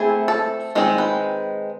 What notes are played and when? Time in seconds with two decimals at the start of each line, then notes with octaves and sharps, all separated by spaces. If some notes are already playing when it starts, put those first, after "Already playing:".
Already playing: A3 C4 E4 G#4
0.28 A4
0.75 D#3 G#3 C4 D#4
0.98 B4